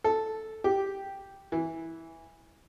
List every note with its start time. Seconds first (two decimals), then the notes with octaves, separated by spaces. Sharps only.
0.04 A4
0.64 G4
1.52 E3